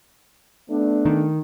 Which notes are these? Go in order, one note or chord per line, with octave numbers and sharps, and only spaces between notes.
A3 B3 D4
D#3